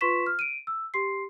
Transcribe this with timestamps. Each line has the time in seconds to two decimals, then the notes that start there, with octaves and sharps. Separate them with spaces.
0.01 F4 B4 C6 C#6 B6 E7
0.26 F6
0.39 D7 D#7
0.67 E6
0.94 G4 C6 C7